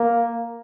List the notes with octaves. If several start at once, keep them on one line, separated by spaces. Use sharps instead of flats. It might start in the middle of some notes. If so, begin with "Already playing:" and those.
Already playing: A#3